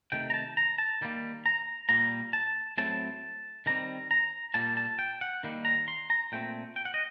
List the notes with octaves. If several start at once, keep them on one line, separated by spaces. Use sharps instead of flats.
C3 D#3 A3 G5
A#5
A5
A#5
A5
D#3 G3 A#3
A#5
A#2 G3 A#3 A#5
A5
A2 F#3 A3 C4 A5
D#3 G3 C4 A#5
A#5
A#2 G3 A#3 A5
A5
G5
F#5
D#3 G3 A#3
A#5
C6
A#5
A#2 A3 C4 G5
G5
F#5
D#5